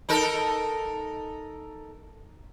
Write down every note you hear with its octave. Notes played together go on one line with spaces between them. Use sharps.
D#4 A4 A#4